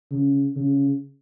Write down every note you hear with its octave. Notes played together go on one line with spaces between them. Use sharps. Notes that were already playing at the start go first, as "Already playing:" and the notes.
C#3
C#3